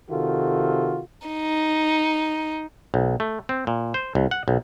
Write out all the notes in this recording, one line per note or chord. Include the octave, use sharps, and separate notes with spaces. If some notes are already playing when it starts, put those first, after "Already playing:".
C3 D#3 F4 F#4 A4
D#4
B1
A3
C4
A#2
C5
C2
F#5
B1